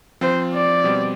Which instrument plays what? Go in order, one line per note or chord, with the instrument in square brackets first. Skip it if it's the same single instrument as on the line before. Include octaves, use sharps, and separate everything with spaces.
[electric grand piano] F3 C4 F4 [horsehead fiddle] C5
[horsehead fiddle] D5
[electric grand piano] B2 G3 C4